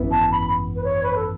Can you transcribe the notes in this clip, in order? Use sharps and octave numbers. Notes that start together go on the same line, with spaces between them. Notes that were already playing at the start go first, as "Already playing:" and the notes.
Already playing: G#1 F#2 E3 B3
A5
B5
B4
C#5
B4
A4